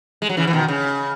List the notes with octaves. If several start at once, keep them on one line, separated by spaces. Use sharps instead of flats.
G#3
F#3
C#3 E3
E3
B2 D#3
C#3